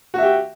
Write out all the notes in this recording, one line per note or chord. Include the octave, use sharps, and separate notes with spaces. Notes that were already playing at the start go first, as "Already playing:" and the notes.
F#4 G4 E5